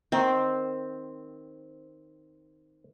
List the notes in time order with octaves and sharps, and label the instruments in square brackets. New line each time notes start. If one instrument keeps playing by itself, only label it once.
[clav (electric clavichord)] D#3 [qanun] C4